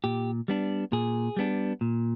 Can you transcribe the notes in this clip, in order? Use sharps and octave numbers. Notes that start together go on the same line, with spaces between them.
A#2 G4
G3 B3 D4
A#2 G#4
G3 B3 D4
A#2